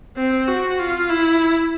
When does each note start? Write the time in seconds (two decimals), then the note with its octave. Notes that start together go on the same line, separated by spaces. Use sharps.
0.17 C4
0.48 F#4
0.79 F4
1.10 E4